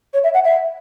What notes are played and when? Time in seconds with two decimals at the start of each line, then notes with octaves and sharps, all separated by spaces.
0.13 C#5
0.23 E5
0.34 F#5
0.44 E5